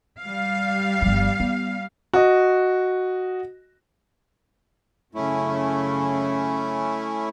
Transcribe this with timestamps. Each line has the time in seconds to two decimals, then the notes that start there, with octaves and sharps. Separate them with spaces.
0.20 G3 F5
1.02 G1 F3
1.40 B3
2.13 F#4 D#5
5.15 F#2 C#3 A3 C#4 E4